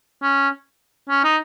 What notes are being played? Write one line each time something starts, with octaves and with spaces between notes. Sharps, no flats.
C#4
C#4
D#4